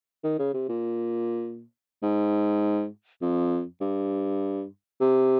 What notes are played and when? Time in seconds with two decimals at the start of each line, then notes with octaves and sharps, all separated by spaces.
0.24 D#3
0.39 C#3
0.54 C3
0.69 A#2
2.03 G#2
3.22 F2
3.81 G2
5.01 C3